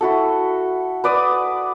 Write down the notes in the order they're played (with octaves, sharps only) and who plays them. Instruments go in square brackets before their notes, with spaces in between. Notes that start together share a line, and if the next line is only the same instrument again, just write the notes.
[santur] E4 F#4 A4
B4 D5 D6 D#6